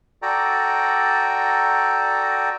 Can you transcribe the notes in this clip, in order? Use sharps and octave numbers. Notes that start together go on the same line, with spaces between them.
F#4 A4 D5 G5 A#5